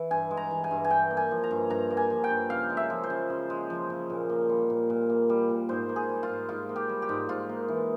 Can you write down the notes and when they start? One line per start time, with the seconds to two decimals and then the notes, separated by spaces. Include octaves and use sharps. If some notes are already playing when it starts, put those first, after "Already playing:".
Already playing: E3
0.11 G2 G#5
0.31 G#3
0.37 A#5
0.51 E3
0.64 G#5
0.71 G2
0.84 G#5
0.90 G2 G5
1.11 A#3
1.17 G#5
1.31 F3
1.44 A#5
1.51 G2
1.70 G2 A#5
1.90 A#3
1.97 G#5
2.10 F3
2.24 G5
2.30 G2
2.50 C#3 F5
2.70 G#3
2.77 E5
2.90 F3
3.04 C5
3.10 C#3
3.30 C#3
3.50 G#3
3.70 F3
3.90 C#3
4.10 A#2
4.29 A#3
4.49 G3
4.70 A#2
4.90 A#2
5.10 A#3
5.29 G3
5.49 A#2
5.69 G#2 C5
5.89 A#3
5.96 G#4
6.09 G3
6.23 F4
6.29 G#2
6.49 G#2 F4
6.69 A#3
6.76 G4
6.89 G3
7.02 G4
7.09 G#2
7.29 G#2 F4
7.49 A#3
7.68 E3